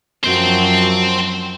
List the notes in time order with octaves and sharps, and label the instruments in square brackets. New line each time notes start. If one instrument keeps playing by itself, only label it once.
[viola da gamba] F#2 F3 F#3 [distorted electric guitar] C5 G5